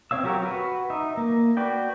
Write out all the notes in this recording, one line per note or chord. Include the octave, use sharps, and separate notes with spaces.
C4 C#5 F5 E6
F#3 F#4 G4 A#4 C#5
F#4 B4
D#4 E5
A#3
F#4 B4 D5 G5